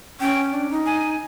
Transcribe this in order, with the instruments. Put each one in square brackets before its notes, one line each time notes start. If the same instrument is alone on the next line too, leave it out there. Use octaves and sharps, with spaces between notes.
[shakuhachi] C#4 [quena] G5
[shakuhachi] D4
D#4
[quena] G#5